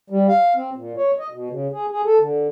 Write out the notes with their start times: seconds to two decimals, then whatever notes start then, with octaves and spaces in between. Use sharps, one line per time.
0.10 G3
0.28 F5
0.56 C4
0.76 A#2
0.97 C#5
1.19 D#5
1.32 B2
1.50 C#3
1.73 G#4
1.91 G#4
2.05 A4
2.20 D3